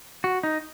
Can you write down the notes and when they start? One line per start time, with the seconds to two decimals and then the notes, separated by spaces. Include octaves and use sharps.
0.24 F#4
0.43 D#4